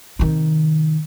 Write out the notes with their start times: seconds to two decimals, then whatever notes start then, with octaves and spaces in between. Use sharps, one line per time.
0.19 C3 D#3